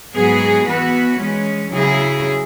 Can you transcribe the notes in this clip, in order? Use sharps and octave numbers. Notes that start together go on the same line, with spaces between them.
G#2 F#3 B3 G#4
E3 B3 F#4 B4
E3 G#3 C#4
C#3 F#3 E4 G#4